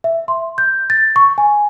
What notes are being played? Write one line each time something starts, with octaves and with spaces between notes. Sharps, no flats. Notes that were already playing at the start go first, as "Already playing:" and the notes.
E5
C6
G6
A6
C#6
G#5